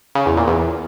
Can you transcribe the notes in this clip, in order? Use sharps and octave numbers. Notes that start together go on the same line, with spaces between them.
C#3
E2
A#2
E2